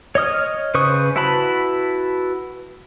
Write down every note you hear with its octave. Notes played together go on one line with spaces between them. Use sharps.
C#5 D#5 D#6 F6
C#3 B4 C5 C#6 D#6
E4 F#4 B4 A5 B5